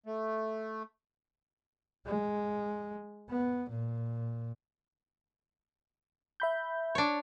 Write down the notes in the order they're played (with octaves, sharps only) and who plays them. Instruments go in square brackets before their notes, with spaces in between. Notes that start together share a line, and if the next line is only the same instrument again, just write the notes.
[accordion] A3
[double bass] G#3
B3
A#2
[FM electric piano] E5 B5 G6
[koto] D4 C#5